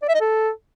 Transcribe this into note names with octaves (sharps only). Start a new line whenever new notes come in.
D5
E5
D#5
A4